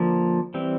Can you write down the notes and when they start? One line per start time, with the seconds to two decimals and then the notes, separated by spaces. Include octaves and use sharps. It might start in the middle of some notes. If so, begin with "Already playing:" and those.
Already playing: D3 F3 A#3
0.54 E3 G3 C4